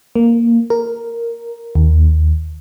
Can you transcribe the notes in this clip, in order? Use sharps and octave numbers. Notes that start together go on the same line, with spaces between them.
A#3
A#4
D#2